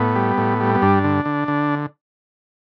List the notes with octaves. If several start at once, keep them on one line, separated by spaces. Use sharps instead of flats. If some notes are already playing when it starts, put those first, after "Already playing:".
Already playing: A2 B3
G3
A2
G3
B3
G2 D4
D3
D3
D3